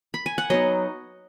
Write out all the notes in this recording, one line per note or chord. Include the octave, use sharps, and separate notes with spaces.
B5
G#5
F#5
F#3 B3 D#4 D#5